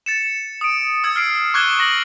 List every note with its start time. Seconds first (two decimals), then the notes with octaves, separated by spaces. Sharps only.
0.06 A6 C#7 E7
0.61 D#6 D7
1.04 D#6 E6 G#6
1.16 F6 C7 D7
1.54 C#6 D6 F#6 G#6 G7
1.79 C#6 A#6 F#7